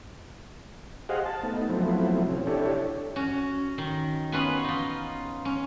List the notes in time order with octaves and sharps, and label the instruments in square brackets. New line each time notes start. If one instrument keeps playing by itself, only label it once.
[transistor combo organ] G4 G#4 C5 D#5 F5 F#5
A5
A3 B3 D#4
F3 F#3 A3 B3 C4 E4
C3 C#4
D4 E4 G4 A4 C#5
[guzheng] C#4 F#4
D#3
B3 C#4 F4 B4 F#5 G#5
D#4 F4
C#4